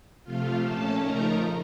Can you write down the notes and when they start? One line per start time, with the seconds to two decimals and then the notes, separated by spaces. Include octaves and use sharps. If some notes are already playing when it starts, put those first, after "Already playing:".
0.24 C3 F3 A3 F4 F5
0.62 A#2 A3 C#4 A4 A5
0.99 C#3 F3 A3 D#4 A#4 A#5